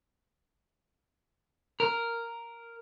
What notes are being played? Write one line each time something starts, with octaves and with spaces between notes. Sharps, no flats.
A#4